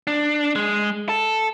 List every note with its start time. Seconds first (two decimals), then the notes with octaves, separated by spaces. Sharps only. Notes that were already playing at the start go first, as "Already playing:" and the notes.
0.07 D4
0.56 G#3
1.09 A4